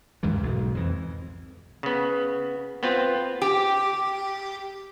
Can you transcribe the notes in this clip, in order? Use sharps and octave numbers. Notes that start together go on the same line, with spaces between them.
D#2 G#2 C#3 E3
B1 G#2 B2
F2 E3
C#3 B3
B3 C4 F4
G4